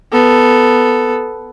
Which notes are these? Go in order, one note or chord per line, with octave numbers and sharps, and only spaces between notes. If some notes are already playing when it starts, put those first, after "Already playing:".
B3 A4